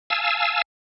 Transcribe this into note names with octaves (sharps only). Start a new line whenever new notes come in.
F5 G#5 A5 E6